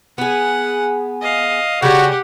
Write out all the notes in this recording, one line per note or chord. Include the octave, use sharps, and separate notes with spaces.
B3 G#4 F#5
D#5 F5
C#3 G3 F#4 G4 F#5